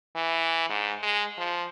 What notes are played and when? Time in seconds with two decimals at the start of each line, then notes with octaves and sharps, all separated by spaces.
0.16 E3
0.69 G#2
1.03 G#3
1.38 F3